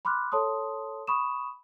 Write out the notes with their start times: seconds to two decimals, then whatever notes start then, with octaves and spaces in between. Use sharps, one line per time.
0.05 B5 C6 D6 F6 F#6
0.32 A4 C#5 A5 C6 D#6
1.07 B5 C#6 D#6 E7